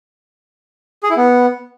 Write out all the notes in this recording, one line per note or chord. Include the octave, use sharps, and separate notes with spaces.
G#4
E4
B3